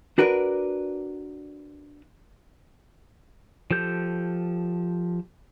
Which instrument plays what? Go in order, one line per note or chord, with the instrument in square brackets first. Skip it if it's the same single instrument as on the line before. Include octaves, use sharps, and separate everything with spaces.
[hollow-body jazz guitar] D4 F#4 A#4 B4 D5
[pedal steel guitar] F3 G4 A4 G6